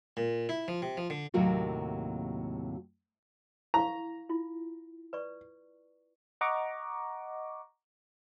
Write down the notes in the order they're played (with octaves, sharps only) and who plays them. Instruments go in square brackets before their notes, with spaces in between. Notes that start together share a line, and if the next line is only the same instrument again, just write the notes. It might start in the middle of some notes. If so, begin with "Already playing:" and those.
[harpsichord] A#2
E4
F3
C3
F3
D3
[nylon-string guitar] D#2 A2 C3 F#3 A#3 F#4
[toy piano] E4 F5 C#6 [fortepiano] A#5
[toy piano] E4 F4
B4 D5 C#6
[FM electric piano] D#5 F#5 A#5 C#6 D6